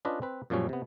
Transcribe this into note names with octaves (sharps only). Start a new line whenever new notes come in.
C#4 D4 F4 B4 D#5
C4 B4
F#2 A#2 F3 G3 C#4
C3 B3